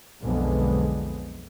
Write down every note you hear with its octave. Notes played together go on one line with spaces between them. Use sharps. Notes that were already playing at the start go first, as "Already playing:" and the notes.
B1 F2 D3 G#3 B3